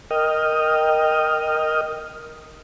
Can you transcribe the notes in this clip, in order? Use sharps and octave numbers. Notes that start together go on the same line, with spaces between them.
A#4 D#5 G5 D#6 F6